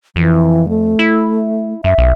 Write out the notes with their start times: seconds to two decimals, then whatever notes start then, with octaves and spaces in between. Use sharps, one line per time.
0.16 F2 E3
0.69 A3
0.99 E4
1.84 F#2 E5
1.98 B1